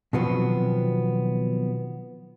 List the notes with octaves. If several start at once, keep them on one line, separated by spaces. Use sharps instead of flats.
B2 D#3 F3 F#3 B3 C4